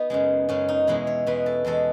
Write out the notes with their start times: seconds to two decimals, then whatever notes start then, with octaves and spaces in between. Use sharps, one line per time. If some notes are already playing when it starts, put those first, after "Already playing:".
Already playing: B3 D#4
0.10 F#2 C#3 G#3
0.49 F#2 C#3 G#3 C#4
0.68 D#4
0.87 E2 B2 G#3 E4
1.07 C#5
1.27 E2 B2 G#3 B4
1.46 A4
1.65 E2 B2 G#3 A4